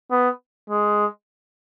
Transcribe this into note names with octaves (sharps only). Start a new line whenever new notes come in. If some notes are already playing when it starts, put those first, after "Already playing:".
B3
G#3